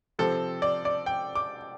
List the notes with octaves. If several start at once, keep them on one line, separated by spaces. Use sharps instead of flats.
C3 F3 C4 A4
D5
D5
G5
D6